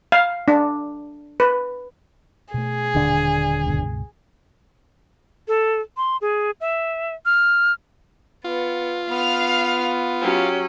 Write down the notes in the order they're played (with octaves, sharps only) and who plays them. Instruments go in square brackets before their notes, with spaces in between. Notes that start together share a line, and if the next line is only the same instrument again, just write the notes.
[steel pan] F5
D4
B4
[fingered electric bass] B2 A3 [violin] G#4
[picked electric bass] D#1 D3 D4
[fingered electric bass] C#2 G2 B2
[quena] A4
C6
G#4
E5
F6
[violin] B3 [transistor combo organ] F4
[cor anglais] B3 [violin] F5 F6
[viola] F#3 C#4 [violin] G4